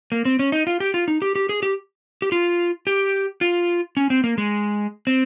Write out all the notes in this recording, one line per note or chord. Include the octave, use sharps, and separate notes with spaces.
A#3
C4
C#4
D#4
F4
G4
F4
D#4
G4
G4
G#4
G4
G4
F4
G4
F4
C#4
C4
A#3
G#3
C4